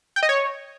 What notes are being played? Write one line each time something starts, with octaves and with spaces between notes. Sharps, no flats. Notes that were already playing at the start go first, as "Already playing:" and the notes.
G5
D#5
C#5